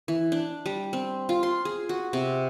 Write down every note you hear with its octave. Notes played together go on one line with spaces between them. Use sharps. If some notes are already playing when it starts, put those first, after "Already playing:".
E3
D4
G3
C4
F4
C6
G#4
F#4
C3